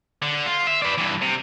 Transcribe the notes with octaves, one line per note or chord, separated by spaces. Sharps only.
D3
F4
E5
B4 D5
G2 E3
C3